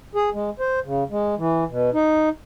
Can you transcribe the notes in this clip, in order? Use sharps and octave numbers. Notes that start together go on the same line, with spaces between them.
G#4
G#3
C5
C#3
G#3
E3
B2
D#4